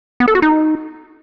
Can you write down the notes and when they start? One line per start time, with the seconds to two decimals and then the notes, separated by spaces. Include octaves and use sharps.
0.20 B3
0.28 A4
0.35 F#4
0.42 D#4